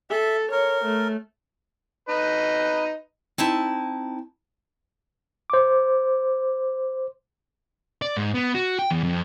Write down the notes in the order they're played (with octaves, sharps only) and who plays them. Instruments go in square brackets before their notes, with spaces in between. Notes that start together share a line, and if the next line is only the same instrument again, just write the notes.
[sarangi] A4 [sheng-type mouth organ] E5
[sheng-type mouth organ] A#4 [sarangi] C#5
[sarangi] A3
[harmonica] D#4 B4 D#5
[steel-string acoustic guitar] C4 D#4 E4 A5
[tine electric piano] C5 D6
[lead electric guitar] D5
G#2
B3
F#4
G5
E2
F2